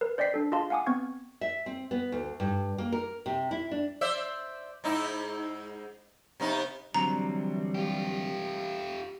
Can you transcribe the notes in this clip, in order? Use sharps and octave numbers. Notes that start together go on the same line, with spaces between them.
A#4 B4
C5 D5 D#5 G5 B6 C7
D4 A4
F4 G#4 D#5 F5 A5 C6
F5 F#5 G#5 D6 D#6
B3 C4 C#6 G#6
E5
C4
B3
D2
G2
A#3
A#4
C3
E4
D4
C5 D5 E5
G#2 D#4 E4
C3 B3 D#4
D3 E3 F#3 G3 C4 A#5
F4 G4